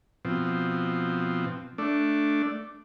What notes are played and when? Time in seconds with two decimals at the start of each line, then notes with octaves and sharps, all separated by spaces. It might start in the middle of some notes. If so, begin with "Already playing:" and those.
0.25 B2 F3 C4
1.78 A3 D4